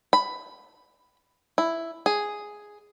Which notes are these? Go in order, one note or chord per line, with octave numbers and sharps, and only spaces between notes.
B5
E4
G#4